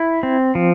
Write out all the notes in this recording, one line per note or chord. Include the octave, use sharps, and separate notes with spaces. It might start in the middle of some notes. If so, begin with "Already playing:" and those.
Already playing: E4
C4
F3